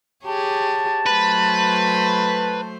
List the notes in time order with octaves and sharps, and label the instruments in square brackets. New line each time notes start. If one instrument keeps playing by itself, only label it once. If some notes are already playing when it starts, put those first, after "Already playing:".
[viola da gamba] G4 G#4 C#5 [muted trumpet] A5
[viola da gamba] F#3 A3 C5 [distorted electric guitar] B4